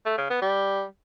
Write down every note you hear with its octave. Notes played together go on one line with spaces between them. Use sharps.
A3
C#3
B3
G3